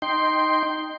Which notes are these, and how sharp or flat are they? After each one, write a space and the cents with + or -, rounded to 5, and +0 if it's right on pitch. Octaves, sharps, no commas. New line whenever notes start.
D#4 +0 G5 +0 C6 +0